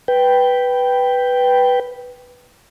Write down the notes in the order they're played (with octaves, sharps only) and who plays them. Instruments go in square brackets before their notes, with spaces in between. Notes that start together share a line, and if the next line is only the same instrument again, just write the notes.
[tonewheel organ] B4 G5